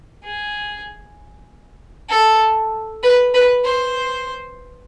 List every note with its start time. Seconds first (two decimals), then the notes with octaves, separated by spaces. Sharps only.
0.23 G#4
2.09 A4
3.03 B4
3.34 B4
3.64 C5